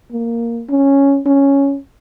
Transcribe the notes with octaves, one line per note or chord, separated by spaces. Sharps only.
A#3
C#4
C#4